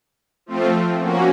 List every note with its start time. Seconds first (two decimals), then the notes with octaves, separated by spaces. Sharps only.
0.46 F3 A3 C4 F4
1.02 A#3 C#4 F#4